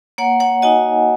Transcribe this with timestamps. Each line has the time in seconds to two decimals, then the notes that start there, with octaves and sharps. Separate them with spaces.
0.18 A#3 C#5 F#5
0.40 C#5 F#5
0.62 D#4 F#4 D#5 G#5